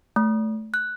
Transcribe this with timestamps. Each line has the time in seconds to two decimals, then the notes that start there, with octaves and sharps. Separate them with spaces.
0.16 A3
0.74 F#6